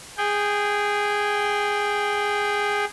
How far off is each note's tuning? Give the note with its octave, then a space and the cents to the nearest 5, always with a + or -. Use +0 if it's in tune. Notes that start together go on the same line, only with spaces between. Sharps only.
G#4 -10 G5 +0